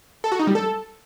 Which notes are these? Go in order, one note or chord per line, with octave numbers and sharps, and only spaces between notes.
A4
F#4
D#4
G3
A4